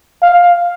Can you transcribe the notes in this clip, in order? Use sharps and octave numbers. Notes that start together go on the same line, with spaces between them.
F5